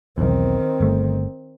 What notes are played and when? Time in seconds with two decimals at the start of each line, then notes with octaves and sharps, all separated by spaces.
0.18 B1 E2 D#3 C4
0.81 G1 A3